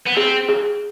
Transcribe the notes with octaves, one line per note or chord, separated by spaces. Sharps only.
B3
C4 G#4
G#4